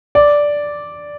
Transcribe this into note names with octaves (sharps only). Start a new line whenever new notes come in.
D5